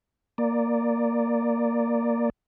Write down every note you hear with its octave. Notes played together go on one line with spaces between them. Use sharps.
A#3 D5